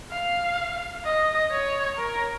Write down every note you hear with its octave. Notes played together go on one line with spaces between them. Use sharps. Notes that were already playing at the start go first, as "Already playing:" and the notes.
F5
D#5
C#5
A#4